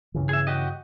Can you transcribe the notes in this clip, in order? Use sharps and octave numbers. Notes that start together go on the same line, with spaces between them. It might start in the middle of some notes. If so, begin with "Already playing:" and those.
G2 C#3 E3
G#4 E5
F#4 G4 D#5